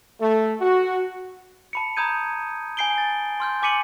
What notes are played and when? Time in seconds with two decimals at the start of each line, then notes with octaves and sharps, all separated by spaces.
0.20 A3
0.60 F#4
1.73 A5 B5 C#7
1.96 A#5 B5 D#6 G6 G#6 D#7
2.77 G#5 G6 C7 D7 G7
2.98 A6
3.40 C6 F6 G6
3.62 G#5 D6 B6 C#7 D#7 F#7